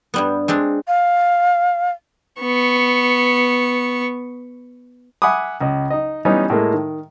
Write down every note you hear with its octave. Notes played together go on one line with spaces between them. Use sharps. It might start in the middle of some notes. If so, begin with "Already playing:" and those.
G2 G3 B3
G#3 C4 D4
F5
B3 C#6
E5 F#5 G#5 B5 D6 D#6
C#2 D#5
D#4 D#5
E3 G3 B3 C#4 D#4
A2 G#3 A#3
D#3